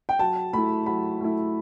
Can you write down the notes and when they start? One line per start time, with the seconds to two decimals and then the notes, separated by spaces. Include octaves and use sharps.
0.09 G5
0.19 F#3 A5
0.53 A3 E4 B5
0.86 F#3 B5
1.21 A3 E4